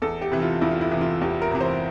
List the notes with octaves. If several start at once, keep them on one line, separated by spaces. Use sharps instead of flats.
E2 A4
G4
C3 E3
F4
E2 E4
F4
E4
C3 E3
F4
E2 G4
A#4
C3 E3
C5